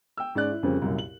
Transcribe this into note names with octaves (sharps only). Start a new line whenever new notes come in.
G5 E6
G#2 C#4 D5 F#6
E4
F2 C#3 G3 A#3 C4 C#4
C2 F#2 A#2
F#7